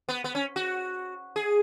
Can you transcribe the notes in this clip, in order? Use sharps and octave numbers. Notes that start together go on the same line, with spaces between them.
B3
B3
C#4
F#4
G#4